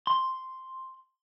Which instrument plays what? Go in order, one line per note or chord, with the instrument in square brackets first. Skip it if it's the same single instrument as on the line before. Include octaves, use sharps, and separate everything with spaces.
[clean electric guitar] C6